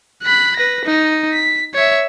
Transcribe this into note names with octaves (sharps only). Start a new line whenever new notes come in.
B5 F#6
B4 A#6
D#4
B6
C#5 E5